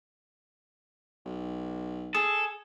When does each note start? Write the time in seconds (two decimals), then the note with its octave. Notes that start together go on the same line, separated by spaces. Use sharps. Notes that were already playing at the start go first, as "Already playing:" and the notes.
1.25 B1
2.15 G#4 A4